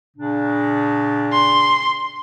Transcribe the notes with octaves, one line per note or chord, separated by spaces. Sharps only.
A#2 C#3 D4
C6